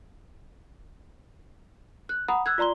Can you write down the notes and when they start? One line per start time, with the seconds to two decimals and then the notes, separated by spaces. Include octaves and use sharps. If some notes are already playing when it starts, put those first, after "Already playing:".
2.09 F#6
2.28 F#5 A#5 B5 D#6
2.46 E6 F#6 G#6
2.58 F4 D5 A#5 C6 G7